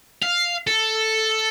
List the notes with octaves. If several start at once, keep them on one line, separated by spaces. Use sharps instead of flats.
F5
A4